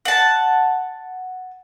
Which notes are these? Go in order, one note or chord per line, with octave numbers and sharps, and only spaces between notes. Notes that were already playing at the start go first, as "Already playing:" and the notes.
F#5 A5